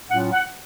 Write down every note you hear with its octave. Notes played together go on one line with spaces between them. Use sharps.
A2 F#3 C#4 F4 F#5
F#5